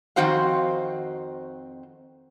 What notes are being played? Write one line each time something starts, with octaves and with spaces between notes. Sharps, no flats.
F2 D#3 C4 F#4 C5 F5